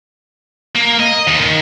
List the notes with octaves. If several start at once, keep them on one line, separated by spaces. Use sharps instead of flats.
A#3
D#5
D#2
D#3